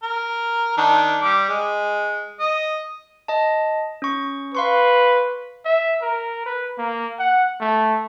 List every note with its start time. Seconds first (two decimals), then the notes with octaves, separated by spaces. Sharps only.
0.03 A#4
0.78 D#3 D4
1.21 G3 D6
1.49 G#3
2.40 D#5
3.28 D#5 A5
4.02 C#4 C#6
4.55 B4 F5 C6 C#6
5.65 E5
6.02 A#4
6.46 B4
6.78 A#3
7.19 F#5
7.60 A3